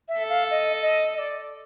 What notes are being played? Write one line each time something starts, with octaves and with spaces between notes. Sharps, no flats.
E5
A4
F5
D#5
D#5
D#5
D5